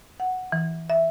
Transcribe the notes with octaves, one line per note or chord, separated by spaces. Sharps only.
F#5
E3
E5